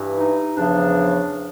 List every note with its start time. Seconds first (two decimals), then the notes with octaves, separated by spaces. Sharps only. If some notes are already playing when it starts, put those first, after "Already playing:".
Already playing: G2 E3
0.16 D#4
0.56 E2 C#3 F3 D4